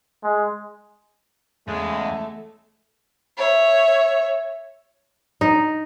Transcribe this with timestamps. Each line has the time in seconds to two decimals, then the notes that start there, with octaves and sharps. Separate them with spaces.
0.23 G#3
1.68 E2 C#3 G#3 A3
3.36 C#5 E5
5.41 D#4